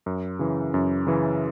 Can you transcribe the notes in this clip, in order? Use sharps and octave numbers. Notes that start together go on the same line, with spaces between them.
F#2
C#3 E3
F#2
C#3 E3